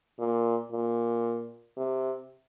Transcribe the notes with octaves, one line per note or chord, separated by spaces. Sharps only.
A#2
A#2
C3